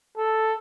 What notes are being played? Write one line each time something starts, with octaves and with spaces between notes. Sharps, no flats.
A4